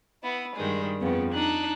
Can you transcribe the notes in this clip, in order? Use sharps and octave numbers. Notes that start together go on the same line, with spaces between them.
B3 E4
G2 D#3 G3 G#3
F2 C#3 B3
D4 D#4 F#6